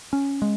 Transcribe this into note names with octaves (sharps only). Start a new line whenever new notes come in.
C#4
G#3